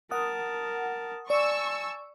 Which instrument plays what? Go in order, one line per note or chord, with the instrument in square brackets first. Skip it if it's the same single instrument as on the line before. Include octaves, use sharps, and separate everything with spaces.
[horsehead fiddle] A#4 A5 [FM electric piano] F#5 D#6
[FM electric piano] D5 [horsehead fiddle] G#5 A5 [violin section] C#6 E6